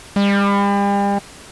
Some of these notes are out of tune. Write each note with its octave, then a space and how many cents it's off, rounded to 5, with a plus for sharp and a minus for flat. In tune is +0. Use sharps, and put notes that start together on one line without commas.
G3 +40